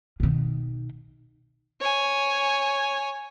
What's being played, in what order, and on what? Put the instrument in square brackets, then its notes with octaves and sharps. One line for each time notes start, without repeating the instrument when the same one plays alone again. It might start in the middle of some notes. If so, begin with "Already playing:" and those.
[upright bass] B2 D#3
[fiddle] C#5 G#5